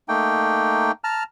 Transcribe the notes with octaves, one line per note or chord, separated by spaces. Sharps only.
A3 A#3 D#4 G5
A5 A#5 F6